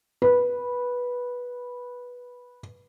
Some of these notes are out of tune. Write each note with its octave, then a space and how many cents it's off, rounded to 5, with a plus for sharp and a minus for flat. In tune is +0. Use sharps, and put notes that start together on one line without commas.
B4 -10